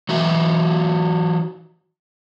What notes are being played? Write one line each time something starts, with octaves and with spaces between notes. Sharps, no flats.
E3 F#3 D#4 F#4 E5